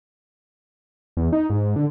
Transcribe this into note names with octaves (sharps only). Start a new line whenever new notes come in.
E2
D#4
G#2
D3